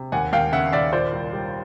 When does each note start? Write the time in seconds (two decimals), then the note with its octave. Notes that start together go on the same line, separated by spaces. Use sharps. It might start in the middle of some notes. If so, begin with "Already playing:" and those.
Already playing: C3
0.12 D#2 F#5 G#5
0.33 D#2 F5 G5
0.53 C#3 E5 F#5
0.73 D#2 D5 E5
0.93 A#2 C5 D5
1.12 C2
1.33 G3